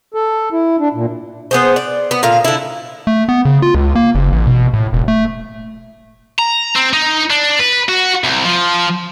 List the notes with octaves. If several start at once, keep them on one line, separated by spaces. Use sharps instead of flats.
A4
E4
D4
A#2
B3 G#4 C5
D5
B3
A#2 D3 F5
D3 E4
A3
B3
C#3
F4
C#2
A#3
F#1
A1
B2
A2
E1
A3
A#5
C4
D#4
D4
B4
F#4
C2
F3